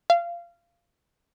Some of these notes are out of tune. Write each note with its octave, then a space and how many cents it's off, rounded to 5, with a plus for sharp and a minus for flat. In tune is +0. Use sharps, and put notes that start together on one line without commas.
F5 -20